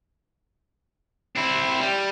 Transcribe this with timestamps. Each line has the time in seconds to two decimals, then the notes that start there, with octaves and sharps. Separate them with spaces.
1.36 C4 E4
1.80 G3